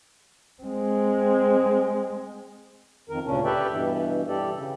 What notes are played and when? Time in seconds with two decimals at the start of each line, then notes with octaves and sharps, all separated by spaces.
0.63 G#3 C4
3.09 F2 D#3 A#4
3.25 D2 A#2 C#3 C#4 D4
3.45 G4 A4 B4 D5 E5 G5
3.70 G2 B2 E3
4.28 E3 G3 G4 A4 D5
4.53 C#3